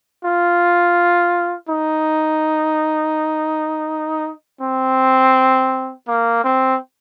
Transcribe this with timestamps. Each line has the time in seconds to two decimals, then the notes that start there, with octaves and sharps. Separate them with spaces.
0.24 F4
1.69 D#4
4.61 C4
6.08 A#3
6.44 C4